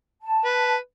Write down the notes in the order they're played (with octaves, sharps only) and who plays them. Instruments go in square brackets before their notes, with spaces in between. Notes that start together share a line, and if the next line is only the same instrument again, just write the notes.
[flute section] A5
[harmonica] B4